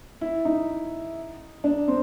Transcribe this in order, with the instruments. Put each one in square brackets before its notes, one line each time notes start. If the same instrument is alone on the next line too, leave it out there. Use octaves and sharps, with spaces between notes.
[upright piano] E4
D#4
D4
C4